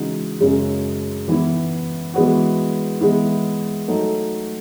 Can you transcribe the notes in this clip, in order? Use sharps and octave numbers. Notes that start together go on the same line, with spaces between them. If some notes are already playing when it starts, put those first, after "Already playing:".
Already playing: C#3 E3 G#3 D#4 F#4
F#2 C#3 G#3
E3 B3 E4
E3 G#3 B3 F#4
E3 G#3 B3 E4
F#3 A3 D#4 A4